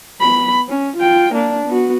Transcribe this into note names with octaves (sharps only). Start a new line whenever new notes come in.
B3 B5
C#4
F4 G5
A#3 D4
B3 F#4